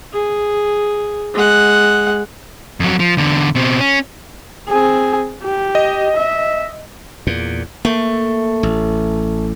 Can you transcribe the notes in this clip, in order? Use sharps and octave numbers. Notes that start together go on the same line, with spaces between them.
G#4
G#3 F#5
F2 F#3
F3
E2 D3
B2 C4
C#4
C4 G#4
G4
D#5
E5
E2 A#2
A3 A#3
A1